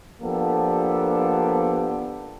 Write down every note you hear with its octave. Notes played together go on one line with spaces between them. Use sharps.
F3 A#3 B3 D4 G4 A4